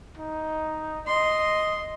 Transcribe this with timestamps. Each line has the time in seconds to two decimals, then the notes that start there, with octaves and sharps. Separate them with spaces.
0.17 D#4
1.07 D#5 C6